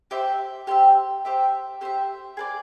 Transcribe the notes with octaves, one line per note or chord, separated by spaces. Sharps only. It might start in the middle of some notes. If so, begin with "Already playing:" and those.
G4 C5 E5
G4 C5 E5
G4 C5 E5
G4 C5 E5
G#4 B4 D5